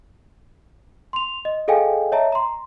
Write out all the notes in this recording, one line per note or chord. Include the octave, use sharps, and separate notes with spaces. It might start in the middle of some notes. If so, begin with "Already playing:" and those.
C6 F7
D#5
G#4 A4 D#5 F5 G5 G#5
C#5 D#5 E5 A5 A#5
A#5 C6